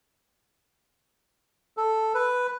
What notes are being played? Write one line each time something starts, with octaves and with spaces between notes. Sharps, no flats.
A4
B4